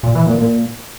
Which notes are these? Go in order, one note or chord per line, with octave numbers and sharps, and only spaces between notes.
A#2
E3
A#2
A#2